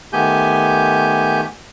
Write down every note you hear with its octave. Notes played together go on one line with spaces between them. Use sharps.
D#3 A3 B3 G4 G#5 G6